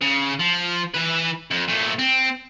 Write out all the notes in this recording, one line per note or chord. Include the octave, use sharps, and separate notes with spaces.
C#3
F3
E3 B4
F2
A#2 A3
C4